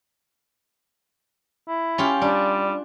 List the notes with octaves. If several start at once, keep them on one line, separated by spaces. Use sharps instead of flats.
E4
C#4 F4 G4
G3 D4